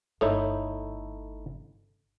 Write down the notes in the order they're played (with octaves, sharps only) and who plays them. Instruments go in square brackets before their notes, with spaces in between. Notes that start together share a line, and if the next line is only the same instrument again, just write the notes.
[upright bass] G1 [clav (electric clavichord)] A3 D#4 E4 [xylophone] A4 C#5